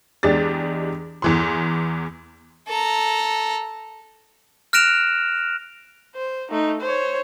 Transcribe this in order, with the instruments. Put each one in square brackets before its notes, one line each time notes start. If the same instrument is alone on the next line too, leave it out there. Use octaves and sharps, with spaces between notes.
[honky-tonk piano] E2 G#3 D4 G4 A6
E2 E3 C6
[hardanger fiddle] A4 A#5
[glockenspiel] F6 F#6 A#6 D7 E7 F7
[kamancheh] C5
A3 D#4
C5 C#5